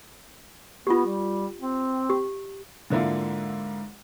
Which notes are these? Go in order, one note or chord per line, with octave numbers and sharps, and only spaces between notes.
B3 F4 G4
G3
C4
G4
G#2 D3 A#3 E4 F4